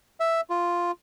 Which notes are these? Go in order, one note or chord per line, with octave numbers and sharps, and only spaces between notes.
E5
F4